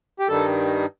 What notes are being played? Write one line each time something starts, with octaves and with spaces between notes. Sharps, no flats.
G4
G2 D#3 G3 A4